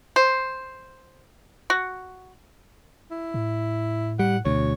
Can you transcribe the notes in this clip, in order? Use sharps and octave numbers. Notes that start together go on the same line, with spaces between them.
C5
F#4
E4
A2
G3 F#5
D2 B2 C#5